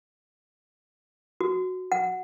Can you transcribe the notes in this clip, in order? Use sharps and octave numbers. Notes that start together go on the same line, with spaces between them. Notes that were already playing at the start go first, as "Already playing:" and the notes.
F#4
F#5